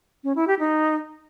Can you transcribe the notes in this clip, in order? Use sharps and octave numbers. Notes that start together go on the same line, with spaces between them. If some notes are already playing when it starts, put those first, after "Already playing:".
C#4
E4
G4
D#4